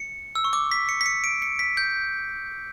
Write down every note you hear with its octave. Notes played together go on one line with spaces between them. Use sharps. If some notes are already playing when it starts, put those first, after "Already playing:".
Already playing: C#7
E6
C#6
D6
B6
C#7
B6
C#7
D7
C#7
B6
G6